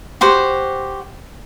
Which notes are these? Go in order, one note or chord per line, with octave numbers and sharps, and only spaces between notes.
F#4 G4 C5